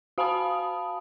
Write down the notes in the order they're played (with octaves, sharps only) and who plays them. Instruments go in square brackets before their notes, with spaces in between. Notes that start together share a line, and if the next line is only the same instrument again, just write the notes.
[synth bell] F#4 F5 G#5 A5 B5 D#6